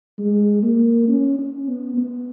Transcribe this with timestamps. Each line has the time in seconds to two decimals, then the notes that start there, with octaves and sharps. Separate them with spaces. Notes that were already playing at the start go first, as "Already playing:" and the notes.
0.19 G#3
0.63 A#3
1.08 C#4
1.39 C#4
1.68 B3
1.97 B3